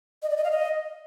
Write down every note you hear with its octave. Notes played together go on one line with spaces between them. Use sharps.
D#5
D5
D#5
F5
D#5